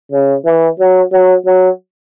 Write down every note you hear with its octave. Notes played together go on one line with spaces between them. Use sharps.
C#3
E3
F#3
F#3
F#3